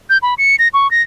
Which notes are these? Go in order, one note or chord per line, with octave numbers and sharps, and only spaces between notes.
G6
B5
C#7
A#6
C#6
A#6